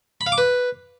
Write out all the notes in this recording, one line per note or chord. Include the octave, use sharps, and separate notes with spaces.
B5
F5
D6
B4